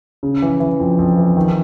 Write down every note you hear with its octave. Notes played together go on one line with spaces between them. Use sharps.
C#3
E3
E3
F2
F2
E3
D#3